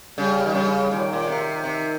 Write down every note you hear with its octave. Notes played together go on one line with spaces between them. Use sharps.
C#3 G3
D#3
C#3 G3
A#2 D#3
A#2
C3
C3